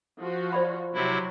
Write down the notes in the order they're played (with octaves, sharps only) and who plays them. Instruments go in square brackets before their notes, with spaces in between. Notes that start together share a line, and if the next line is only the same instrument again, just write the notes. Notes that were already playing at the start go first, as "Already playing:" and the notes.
[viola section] F3 F#4
[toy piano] C5 D5 B5
[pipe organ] C3 E4 [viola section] F#3